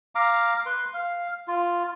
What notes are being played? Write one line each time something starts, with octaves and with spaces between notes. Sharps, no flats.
F5 A#5 D6
B4 C6
F5
F4